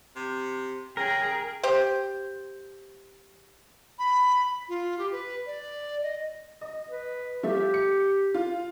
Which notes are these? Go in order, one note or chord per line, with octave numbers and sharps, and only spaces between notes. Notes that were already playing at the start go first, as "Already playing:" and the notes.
C3
C#3 G#4 A#4 G5
G4 C5
B5
F4
G4
B4
D5
D#5
D#5
B4
F3 A3 G4 E5
C#7
F4